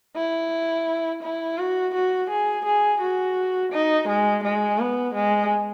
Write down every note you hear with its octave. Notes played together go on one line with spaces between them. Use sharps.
E4
E4
F#4
F#4
G#4
G#4
F#4
D#4
G#3
G#3
B3
G#3